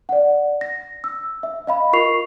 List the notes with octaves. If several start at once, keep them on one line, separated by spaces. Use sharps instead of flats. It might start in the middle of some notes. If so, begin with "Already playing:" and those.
D5 F#5
A#6
E6
E5
D#5 F5 B5
F4 A#4 C#6 C7 F7